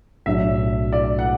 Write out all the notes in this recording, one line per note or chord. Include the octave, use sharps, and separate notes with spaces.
B1 A2 F#3 D4 E5
D5
F#5